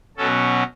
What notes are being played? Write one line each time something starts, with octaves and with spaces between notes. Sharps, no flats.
B2 F#3 C#4 A4